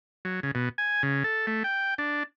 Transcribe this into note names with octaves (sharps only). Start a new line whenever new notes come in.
F#3
C#3
B2
G#5
C#3
A4
A3
G5
D4